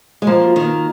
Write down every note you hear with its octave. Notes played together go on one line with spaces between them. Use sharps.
G#3
F3 A#3
F4
D#3
A#3